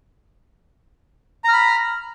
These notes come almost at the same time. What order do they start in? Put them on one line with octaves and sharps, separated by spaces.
A#5 F6 B5